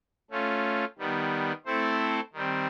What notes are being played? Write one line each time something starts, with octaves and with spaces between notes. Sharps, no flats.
A3 C#4 F4
D#3 G3 B3
A3 C4 E4 A4 C5
D#3 G3 C4